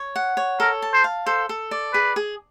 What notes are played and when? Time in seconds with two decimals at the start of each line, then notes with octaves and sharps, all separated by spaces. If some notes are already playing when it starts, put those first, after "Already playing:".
Already playing: C#5
0.16 F#5
0.37 C#5
0.60 A4 A#4
0.82 A5
0.93 C5
1.04 F5
1.26 A4 C5
1.49 A4
1.71 D5
1.93 G#4 B4
2.16 G#4